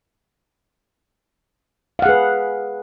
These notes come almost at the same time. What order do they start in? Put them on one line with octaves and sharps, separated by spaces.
F5 F#5 G#4 B4